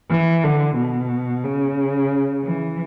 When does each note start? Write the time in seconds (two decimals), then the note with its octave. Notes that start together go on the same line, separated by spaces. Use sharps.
0.10 E3
0.44 D3
0.76 B2
1.44 C#3
2.44 E3